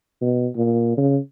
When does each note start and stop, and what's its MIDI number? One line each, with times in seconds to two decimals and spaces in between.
0.22 0.48 47
0.56 0.95 46
0.97 1.17 49